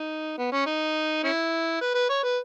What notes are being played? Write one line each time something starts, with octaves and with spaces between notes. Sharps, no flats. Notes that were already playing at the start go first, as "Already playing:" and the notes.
Already playing: D#4
B3
C#4
D#4
C#4 E4
B4
B4
C#5
B4